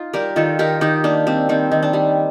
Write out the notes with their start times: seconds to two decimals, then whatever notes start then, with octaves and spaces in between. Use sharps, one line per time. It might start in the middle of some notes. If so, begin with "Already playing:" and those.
Already playing: D#4 F4
0.13 G3 G4 A#4
0.36 D#3 F4 A4
0.59 D#3 G4 A#4
0.81 D#3 D#4 G4
1.04 A#3 D4
1.27 G3 C4
1.49 D#3 C4
1.71 D#3
1.83 D4
1.93 G3